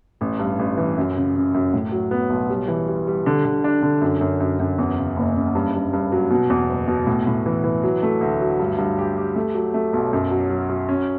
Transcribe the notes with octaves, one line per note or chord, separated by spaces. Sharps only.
A1
G2
A1
E3
F#2
C#3
C#3
F#2
A2
F#3
B3
B1
G3
E3
G3
G3
D3
D3
D4
D3
F#2
F#2
F#2
F#2
E2
C#3
F#1
C#3
G2
G2
G2
F#3
B2
E2
F#1
B2
A2
A2
E3
E3
F#3
A3
D2
F#3
G2
G2
G4
G4
A3
F#3
A3
B1
F#2
F#3
F#3
F#3
C#4